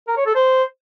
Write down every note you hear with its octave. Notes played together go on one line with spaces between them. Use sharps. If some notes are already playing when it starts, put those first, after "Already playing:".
A#4
C#5
A4
C5